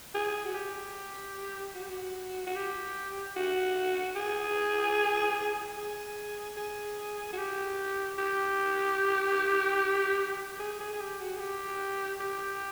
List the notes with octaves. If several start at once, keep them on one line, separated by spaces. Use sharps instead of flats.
G#4
F#4
G4
F#4
G4
F#4
F#4
G4
F#4
G#4
G#4
G#4
F#4
G4
G4
G4
G#4
G#4
G#4
G4
F#4
G#4
G4
G4